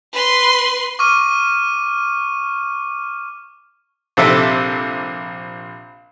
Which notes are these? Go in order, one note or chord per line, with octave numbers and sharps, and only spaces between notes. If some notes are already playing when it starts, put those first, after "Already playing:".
B4 C6
C#6 D6 F6 D#7
A#1 C3 A4 E5